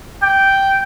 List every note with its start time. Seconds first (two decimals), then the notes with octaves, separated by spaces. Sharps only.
0.23 G5